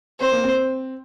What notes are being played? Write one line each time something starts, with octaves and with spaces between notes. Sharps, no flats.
C4 C5
A#3
C4